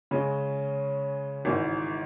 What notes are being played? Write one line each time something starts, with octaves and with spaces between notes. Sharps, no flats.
C#3 G#3 C#4
G#1 G#2 E3